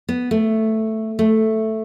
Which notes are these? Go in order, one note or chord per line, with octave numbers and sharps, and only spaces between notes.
B3
A3
A3